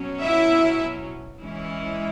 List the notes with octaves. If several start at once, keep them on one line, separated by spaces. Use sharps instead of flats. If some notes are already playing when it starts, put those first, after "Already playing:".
Already playing: B2 F#3 C#4
E4 E5
E3 G#3 C#4 E4